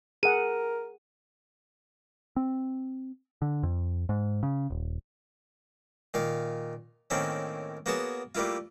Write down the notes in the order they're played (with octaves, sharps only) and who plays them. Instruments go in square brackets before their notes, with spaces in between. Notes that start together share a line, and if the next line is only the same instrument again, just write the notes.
[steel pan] G#4 F#5 [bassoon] A#4 [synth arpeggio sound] D#7
[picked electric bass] C4
D3
F2
G#2
C#3
D#1
[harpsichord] A#2 D#3 F5
A2 D#3 A#3 C4 C#4
A#3 B3 F#4 G#4 C#5 A5
G3 A3 A#3 E4 F4